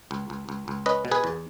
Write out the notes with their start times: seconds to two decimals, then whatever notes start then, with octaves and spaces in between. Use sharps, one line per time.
0.11 C#2
0.30 C#2
0.49 C#2
0.68 C#2
0.86 C#4 B4 D#5
1.05 B2
1.11 G#4 B4
1.24 E2